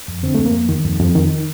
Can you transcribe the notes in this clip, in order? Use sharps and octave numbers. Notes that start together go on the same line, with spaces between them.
F2
D3 C4
F2 A3
A#3
F2
D#3
F2
F2
D#3